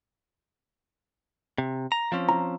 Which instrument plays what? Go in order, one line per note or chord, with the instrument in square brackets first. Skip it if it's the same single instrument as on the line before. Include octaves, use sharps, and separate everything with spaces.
[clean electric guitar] C3
A#5
F3 C4 C#4
[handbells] A#5